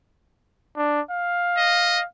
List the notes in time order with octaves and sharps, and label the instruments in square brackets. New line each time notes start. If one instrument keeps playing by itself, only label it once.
[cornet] D4
F5
[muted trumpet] D#5